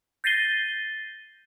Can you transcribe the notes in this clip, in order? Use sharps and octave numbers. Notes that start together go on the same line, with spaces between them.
G6 A6 A#6 C7 D#7 G7